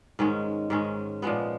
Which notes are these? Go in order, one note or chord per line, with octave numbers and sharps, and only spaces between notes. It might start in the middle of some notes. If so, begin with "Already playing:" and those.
G#2 D#3 G#3 C#4
G#2 D#3 G#3 C#4
A#2 F3 G#3 B3